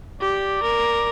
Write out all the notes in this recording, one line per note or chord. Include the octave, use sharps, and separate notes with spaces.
G4 D5
A#4